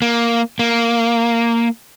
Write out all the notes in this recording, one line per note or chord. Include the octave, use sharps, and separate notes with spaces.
A#3
A#3